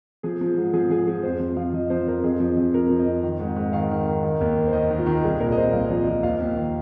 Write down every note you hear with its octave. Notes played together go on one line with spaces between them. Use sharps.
F3 G#4
F3
G#2
F3 G#4
F3 G#4
F3 G#4
F2 C5
F3
F3 F5
F3 D#5
F3 C5
F2 A#4
F2 G#4
F3
F2
F3 A#4
F3
D#5
F2
D#3
G#2
G#2
D#3 F5
D#3
D#3
D#3
D#2
D#3
C5
D#3 D#5
D#3
F4
D#3
C2 G#4
A#2 A#4
D#5
A#2 C5
C2 F5
F3
F3
D#2 F5
D#2
D#3